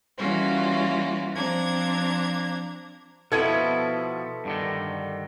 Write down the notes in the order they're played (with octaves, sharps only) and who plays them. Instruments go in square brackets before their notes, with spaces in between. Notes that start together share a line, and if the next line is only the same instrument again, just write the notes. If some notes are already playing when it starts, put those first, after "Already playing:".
[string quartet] E3 G3 A#3 C#4 F4 F#4
F3 C4 D4 A#5 G#6
[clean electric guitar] B2 F3 [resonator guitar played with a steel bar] B3 E4 [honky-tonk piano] A4 G#6 D#7
[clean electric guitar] G2 D3 D#3